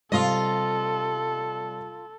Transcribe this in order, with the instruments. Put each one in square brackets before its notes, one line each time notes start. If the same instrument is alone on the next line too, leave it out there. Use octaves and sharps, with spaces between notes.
[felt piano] C3 G3 [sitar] F4 D#5 [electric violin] A4